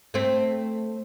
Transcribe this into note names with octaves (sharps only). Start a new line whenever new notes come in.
A3 C4